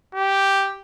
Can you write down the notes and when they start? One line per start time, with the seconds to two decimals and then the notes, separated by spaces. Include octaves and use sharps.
0.14 G4